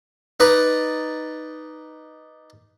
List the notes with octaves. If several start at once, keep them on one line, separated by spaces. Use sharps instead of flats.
D#4 B4 D5